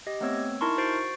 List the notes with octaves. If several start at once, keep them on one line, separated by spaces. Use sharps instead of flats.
G4 D#5
A3 B3 C4 C#5 E6 G#6
D#4 E4 A#4 A5 C6 C#6
F#4 C5 C#6 A6 C7 D7